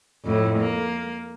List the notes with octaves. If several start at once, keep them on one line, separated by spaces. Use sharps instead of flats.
F2 A2
A#3